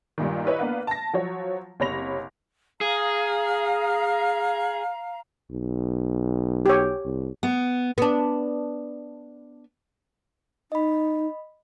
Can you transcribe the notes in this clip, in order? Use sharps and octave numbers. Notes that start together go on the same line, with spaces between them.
G2 A#2 D#3
E4 B4 C#5 D#5
A#3 B3 D4 B4 F5
A5 A#6
F3 F#3 C#5
F#1 C3 C#5 B5 A#6 F7
G#4 F5 A#5
B1
G4 C#5
C2
B3
B3 D4
D#4 D#5 B5